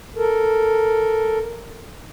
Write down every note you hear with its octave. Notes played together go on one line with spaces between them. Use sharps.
A4 A#4